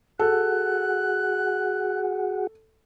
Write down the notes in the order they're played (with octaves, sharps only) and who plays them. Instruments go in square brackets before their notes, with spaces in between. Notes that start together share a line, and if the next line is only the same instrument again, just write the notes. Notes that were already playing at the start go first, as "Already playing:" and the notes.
[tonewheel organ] F#4 G#4 F#5 [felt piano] A4 [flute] F#6